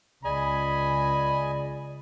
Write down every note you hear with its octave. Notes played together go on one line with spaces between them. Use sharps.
C#2 G#4 D5 D#5 G#5 B5